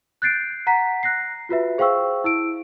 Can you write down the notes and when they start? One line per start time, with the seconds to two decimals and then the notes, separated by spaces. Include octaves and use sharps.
0.22 F#6 G6 A6 C7 D7
0.67 F#5 A#5 B6
1.03 F#6 A#6 C7
1.49 F4 F#4 B4 E5
1.78 G#4 C5 F5 G5 C#6 E6
2.24 E4 E6 D7